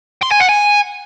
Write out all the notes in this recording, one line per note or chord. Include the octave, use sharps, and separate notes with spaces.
C6
G#5
F#5
G#5